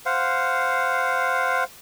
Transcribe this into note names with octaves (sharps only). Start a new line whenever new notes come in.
C5 F5 F#5